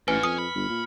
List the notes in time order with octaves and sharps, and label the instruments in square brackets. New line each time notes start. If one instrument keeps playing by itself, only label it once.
[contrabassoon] A1 [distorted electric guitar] G#2 [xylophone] B4 G#5 [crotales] F6 C#7
[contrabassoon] F2 [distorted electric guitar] C#4 G#5 [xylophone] D#6
[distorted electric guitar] B5
[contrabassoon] G1
A#2